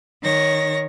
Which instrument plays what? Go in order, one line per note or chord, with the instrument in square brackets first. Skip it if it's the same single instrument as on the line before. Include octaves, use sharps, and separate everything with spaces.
[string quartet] D#3 C#5 A#6